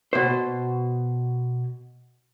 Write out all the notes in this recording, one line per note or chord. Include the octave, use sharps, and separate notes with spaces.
B2 C5